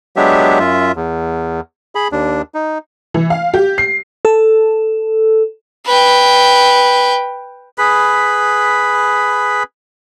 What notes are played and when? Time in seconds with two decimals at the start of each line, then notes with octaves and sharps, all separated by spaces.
0.16 F#3 G#3 B3 D4 G4 E5
0.60 F#2 F4 E5
0.96 E2
1.95 G#4 B5
2.12 D#2 D4
2.55 D#4
3.14 E3
3.30 F5
3.54 G4
3.78 C7
4.25 A4
5.86 B4 G5
7.78 G#4 B4 B5